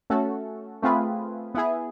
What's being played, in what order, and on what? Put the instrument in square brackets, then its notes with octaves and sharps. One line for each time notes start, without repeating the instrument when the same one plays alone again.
[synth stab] A3 C#4 F#4 A4
A3 C4 F4 G#4 B4
B3 E4 G#4